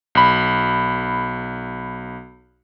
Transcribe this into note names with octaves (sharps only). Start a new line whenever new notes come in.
B1 B5